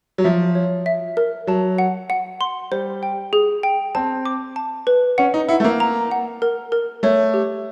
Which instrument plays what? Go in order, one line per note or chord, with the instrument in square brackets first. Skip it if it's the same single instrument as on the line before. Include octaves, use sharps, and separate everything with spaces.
[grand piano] F#3
[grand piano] F3 [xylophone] E5
[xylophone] C#5
E5
A#4
[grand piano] F#3 [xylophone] A5
[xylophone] F#5
F#5
C6
[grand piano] G3 [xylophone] C5
[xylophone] G5
G#4
G5
[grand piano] C4 [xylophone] A5
[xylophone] D6
A5
B4
[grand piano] C#4 [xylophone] F#5
[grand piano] D#4
[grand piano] E4 [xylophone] F#5
[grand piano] A3
A#3
[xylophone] A#5
F#5
A#4
A#4
[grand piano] A3 [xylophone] C#5
[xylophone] G4